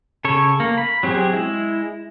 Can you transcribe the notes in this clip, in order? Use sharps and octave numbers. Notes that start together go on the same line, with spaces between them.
C#3 A4 C#5
A#3
B5
F#3 C4 G4 G#4
G#3 E4